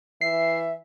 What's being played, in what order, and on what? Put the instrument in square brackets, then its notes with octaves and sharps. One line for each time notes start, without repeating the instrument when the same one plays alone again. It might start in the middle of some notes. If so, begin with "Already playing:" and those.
[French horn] E3 [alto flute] E5 [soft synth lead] C7